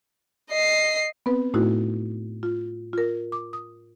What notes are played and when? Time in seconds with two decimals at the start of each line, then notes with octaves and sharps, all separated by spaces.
0.50 D#5 C7
1.26 B3 C4 B4
1.54 A2 A3 D#4 E4 F#4
2.43 F4
2.93 F4 A#4
3.32 D6
3.53 D#6